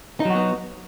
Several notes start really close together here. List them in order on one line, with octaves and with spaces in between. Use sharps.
D#4 F#3 F#4 B3